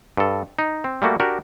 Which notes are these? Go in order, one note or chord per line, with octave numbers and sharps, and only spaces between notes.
G2 A4
D#4
C4
G3 A3 A#3 F#4
D4 F#4 G4 A#4